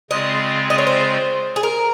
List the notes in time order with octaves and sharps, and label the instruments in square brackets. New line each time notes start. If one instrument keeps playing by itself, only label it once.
[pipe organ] C#3 G#3 C4 F4 G#4 [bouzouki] D#5
[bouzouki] D#5
C#5
C5
G#4
A#4